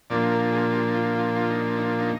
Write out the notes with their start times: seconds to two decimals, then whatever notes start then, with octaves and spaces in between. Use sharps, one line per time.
0.10 A#2 F3 A#3 D4 D5
0.31 A#4
0.52 G#4
0.73 G4
0.94 F4
1.15 F4
1.36 F4
1.50 D#4
1.77 D#4
2.00 D#4